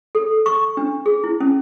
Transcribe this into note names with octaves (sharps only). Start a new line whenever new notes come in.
A4
C#6
D4
G#4
E4
C#4